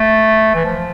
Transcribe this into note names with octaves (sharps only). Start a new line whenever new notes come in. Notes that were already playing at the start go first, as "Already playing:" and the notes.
Already playing: A3
E3
F3